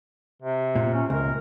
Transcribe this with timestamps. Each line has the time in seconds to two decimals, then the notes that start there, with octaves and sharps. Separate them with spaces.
0.42 C3
0.75 A#2
0.93 C#4
1.10 C#2 A#4